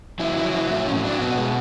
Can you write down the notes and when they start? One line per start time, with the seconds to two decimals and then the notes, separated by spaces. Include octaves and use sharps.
0.20 F#3 E4
0.37 E4
0.45 F#3
0.54 E4
0.71 A2 E4
0.87 C#4
0.95 F#3
1.05 D4
1.21 B2 B3
1.38 G#3